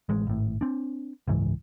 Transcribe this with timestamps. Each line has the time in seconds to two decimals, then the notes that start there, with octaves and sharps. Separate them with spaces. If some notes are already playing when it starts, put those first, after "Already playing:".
0.09 A1 G#3
0.27 G#1 A2
0.61 C4 D4
1.28 F#1 C#2 G#2 E3